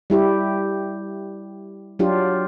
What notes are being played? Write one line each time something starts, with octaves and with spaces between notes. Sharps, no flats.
G3 E4 G4
F#3 D4 F4 G4